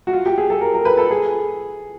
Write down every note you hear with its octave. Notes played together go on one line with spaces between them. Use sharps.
F#4
F4
G4
G#4
A4
A#4
A#4
B4
A4
G#4